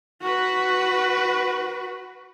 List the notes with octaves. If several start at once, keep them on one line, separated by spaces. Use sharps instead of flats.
F#4 B4